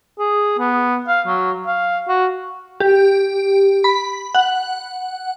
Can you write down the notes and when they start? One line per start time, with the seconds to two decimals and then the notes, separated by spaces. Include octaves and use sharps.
0.19 G#4
0.59 B3
1.08 F5
1.27 F#3
1.67 F5
2.08 F#4
2.80 G4
3.84 B5
4.35 F#5